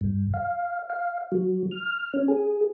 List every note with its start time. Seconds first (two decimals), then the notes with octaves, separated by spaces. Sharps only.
0.01 G2
0.34 F5
0.90 F5
1.32 F#3
1.71 F6
2.14 C#4
2.28 G#4